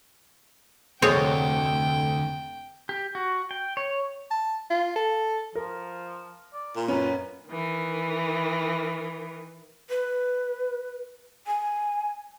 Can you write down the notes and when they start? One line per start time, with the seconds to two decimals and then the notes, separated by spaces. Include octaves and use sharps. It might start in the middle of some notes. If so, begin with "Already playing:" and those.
1.02 F1 D2 C4 G#4 C#5 G5
2.89 G4
3.15 F#4
3.51 G5
3.77 C#5
4.31 A5
4.70 F4
4.96 A4
5.55 F3 A#4
6.54 D5
6.76 A#2
6.88 F#2 C#4 B4
7.48 D#3 E3
9.90 B4
11.47 G#5